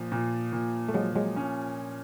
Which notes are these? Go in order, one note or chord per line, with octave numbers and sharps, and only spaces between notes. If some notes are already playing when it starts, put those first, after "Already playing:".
Already playing: A#2 F3
A#2
A#2
A3
F3 F#3 G#3
F#3 G#3
C#4